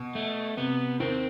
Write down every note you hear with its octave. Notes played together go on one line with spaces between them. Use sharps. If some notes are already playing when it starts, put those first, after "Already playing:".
Already playing: B2
A3
C3 B3
D#2 D#3 C4